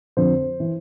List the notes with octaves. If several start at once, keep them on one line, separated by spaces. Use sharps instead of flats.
F2 D3 F3 C5
E3